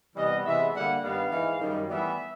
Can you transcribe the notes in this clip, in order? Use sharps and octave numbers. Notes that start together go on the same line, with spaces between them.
C3 E3 G3 B3 D#5
C3 E3 G#3 B3 E5
D3 G3 A#3 F#5
G2 D#3 G3 B3 F5
G#2 E3 G#3
F#2 D#3 G3
A2 E3 G3 B3 E5